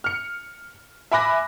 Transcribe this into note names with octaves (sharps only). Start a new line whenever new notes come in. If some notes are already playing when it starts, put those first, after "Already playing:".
F6 C#7
E5 G#5 B5 D6 F#6 A#6